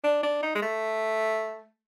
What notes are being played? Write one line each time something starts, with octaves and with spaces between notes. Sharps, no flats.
D4
D4
D#4
G#3
A3